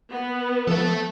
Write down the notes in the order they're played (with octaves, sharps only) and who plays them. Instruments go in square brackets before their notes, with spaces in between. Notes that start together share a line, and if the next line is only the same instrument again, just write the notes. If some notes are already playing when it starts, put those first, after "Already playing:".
[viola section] B3
[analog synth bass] F3 [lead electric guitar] A4 E5